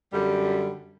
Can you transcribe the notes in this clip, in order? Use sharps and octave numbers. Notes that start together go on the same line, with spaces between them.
F#2 D3 G3